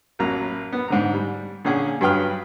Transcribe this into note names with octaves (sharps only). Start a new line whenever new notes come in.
A1 F#3 A#3 A#5
B3
G#2 D3 A#5
G3
A#2 D3 C#4 G#4
G2 F#3 B4 G5 D#6 F6